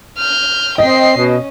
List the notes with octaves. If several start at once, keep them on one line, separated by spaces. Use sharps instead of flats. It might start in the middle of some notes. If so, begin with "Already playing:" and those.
F6 G6
C4 D#5 G5 C7
B2 C#4